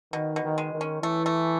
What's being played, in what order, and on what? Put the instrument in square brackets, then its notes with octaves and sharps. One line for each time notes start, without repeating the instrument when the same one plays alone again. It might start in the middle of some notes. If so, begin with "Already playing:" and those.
[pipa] B2 [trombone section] D#3
[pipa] B2
[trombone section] D#3
[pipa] G#3
[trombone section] D#3
[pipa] C#4
[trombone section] E3 [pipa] A3
[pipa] A3